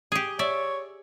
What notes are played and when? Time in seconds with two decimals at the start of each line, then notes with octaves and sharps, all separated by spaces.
0.12 G4 G#4
0.39 C#5 D5 E5